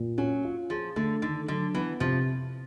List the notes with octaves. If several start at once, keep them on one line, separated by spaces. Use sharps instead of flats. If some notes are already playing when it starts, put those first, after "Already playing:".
Already playing: A#2
F#3 C#4
F4
F3 G#4
D3 A3
D3 D#3
D3 F#3
E3 B3
C3 F3